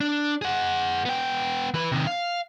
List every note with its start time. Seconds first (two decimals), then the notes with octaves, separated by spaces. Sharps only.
0.01 D4
0.42 G#4 F#5
1.05 B3 G5
1.74 E3 B4
1.92 C3 D#3
2.07 F5